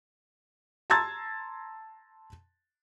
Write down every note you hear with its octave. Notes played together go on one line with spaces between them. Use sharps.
A5 A#5 C6 E6 G#6 A6